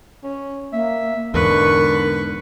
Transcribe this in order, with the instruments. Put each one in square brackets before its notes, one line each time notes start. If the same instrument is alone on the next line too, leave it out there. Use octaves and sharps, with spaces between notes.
[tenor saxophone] C#4
[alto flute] A#3 [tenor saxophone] E5
[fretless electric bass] E2 G#2 [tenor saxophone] D3 [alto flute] A#4 [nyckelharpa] B4 C#6